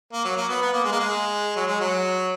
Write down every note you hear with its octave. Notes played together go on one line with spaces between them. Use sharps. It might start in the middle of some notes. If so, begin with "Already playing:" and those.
A#3
F#3
A#3
B3
B3
A#3
G#3
A#3
G#3
F#3
G#3
F#3